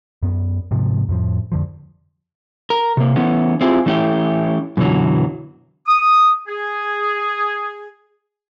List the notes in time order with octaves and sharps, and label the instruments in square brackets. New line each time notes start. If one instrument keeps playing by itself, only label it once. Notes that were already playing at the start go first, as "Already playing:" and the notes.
[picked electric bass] F#2 B3
G#2 C3 F3
F2 A2 F3
F2 D3 F3
[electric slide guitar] A#4
C3 A#3
E3 A3 B3 C#4
C4 E4 F4 G4 G#4
E3 A3 C#4 E4 G4
F#2 B2 D3 E3 F#3
[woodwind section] D#6
G#4